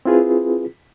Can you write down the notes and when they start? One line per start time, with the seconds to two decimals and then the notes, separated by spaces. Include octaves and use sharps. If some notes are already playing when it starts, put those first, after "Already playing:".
0.05 C4 E4 F4 G#4 B4